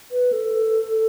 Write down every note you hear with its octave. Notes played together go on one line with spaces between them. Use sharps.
B4
A4